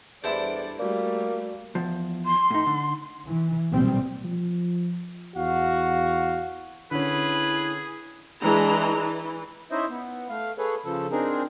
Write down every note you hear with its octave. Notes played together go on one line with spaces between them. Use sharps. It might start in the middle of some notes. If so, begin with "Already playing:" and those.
E2 G3 D4 E4 A4 C5 D5
G3 A3 A#3 F#4 D5
E2 F3
C6
A2 D#4
D3
E3
B1 A#2 D#3 G3 C4
F3
E2 F#4 F5
D3 C#4 E4 G#4 B4
E3 G#3 D4 A#5
E3
C#4 D#4 E4 C5 D#5 E5
B3
A3 F5
G#4 A4 B4 C#5
C#3 F3 A4
C4 D4 D#4 G#4 A#4